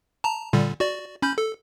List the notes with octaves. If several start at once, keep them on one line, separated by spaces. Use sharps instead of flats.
A5 A#5
A#2 D3 G3
F#4 D5
C#4 B5 G6
A4